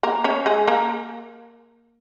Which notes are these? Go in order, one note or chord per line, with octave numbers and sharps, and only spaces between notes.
A#3 A#4
C#4 C#5
G#3 G#4
A#3 A#4